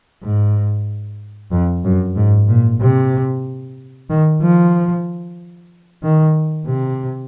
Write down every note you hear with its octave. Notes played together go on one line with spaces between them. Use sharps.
G#2
F2
F#2
G#2
A#2
C3
D#3
F3
D#3
C3